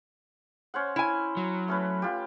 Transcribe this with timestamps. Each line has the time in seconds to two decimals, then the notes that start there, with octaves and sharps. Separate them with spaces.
0.74 C#4 C5 F#5
0.96 E4 G#5
1.37 F#3
1.68 A3 C#4 B4
2.02 F4 G4